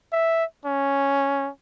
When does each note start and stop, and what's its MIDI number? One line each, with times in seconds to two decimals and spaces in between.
0.12 0.44 76
0.65 1.50 61